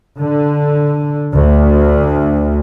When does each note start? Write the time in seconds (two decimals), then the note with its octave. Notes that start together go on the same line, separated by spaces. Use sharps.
0.18 D3
1.34 D2